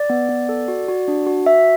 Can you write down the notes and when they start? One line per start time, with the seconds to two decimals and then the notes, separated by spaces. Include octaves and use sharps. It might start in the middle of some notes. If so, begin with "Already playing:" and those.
Already playing: D5
0.10 B3
0.29 B3
0.49 A4
0.68 F#4
0.88 F#4
1.08 D4
1.27 F#4
1.46 F#4 E5